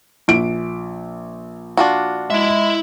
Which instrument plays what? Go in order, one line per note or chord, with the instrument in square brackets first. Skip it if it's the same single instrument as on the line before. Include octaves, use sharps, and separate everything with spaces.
[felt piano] A#1 D7
[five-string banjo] D4 F4 F#4
[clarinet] G#3 [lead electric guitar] E4 E5